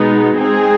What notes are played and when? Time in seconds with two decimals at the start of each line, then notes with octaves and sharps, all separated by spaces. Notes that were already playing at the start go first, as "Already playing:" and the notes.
Already playing: B2 G#3 B3 D#4
0.38 G#3 C4 D#4 G#4